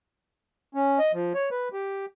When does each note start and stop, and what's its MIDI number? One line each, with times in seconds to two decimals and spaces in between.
0.75 0.99 61
0.99 1.12 75
1.13 1.33 53
1.34 1.49 73
1.51 1.69 71
1.73 2.06 67